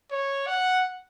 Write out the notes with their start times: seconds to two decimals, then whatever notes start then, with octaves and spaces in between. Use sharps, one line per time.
0.11 C#5
0.46 F#5